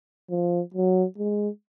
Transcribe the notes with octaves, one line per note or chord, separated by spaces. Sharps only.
F3
F#3
G#3